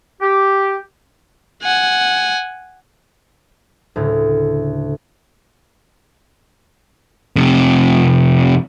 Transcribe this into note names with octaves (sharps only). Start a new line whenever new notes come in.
G4
F#5 G#5
D2 A2 C#3
F2 C3